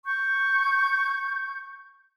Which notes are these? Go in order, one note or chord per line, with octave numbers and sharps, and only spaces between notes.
C#6 G6